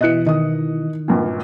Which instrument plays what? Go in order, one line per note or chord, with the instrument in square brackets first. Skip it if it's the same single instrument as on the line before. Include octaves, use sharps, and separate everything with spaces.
[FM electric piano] B2 E3 [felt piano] D#5 F#6 C#7
[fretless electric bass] D#3 [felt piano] D#5 D#6
[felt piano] G#1 G2 A#2